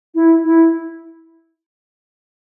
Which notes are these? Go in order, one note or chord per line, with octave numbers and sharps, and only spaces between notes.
E4
E4